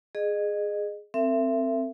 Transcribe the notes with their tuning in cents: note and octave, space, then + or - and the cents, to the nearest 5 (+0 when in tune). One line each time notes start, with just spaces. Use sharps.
G#4 +0 D#5 -30
C4 +0 A#4 -45 E5 +25